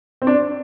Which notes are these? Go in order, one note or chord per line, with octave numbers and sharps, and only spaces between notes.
C4
D4